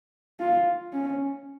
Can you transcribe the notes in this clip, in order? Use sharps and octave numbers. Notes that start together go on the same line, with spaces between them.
F4
C#4